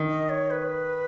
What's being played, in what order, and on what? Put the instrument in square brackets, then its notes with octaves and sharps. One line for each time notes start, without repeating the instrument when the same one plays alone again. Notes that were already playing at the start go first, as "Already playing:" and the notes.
Already playing: [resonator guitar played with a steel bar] D#3
[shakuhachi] D#5
C#5
B4